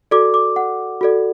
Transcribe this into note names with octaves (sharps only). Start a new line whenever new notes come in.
F#4 A4 D5 D6
D6
F#5
F#4 A4 D5